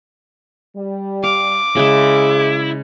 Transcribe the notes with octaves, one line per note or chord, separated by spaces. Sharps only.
G3
F5 D6
C#3 G#3 E4 G#4